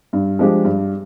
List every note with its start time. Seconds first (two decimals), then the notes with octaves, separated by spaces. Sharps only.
0.13 G2
0.39 F3 G#3 D4 G4
0.65 G2